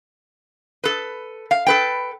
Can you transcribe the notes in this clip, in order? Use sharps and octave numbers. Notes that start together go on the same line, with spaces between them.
A4 B4
F5
A4 B4 G5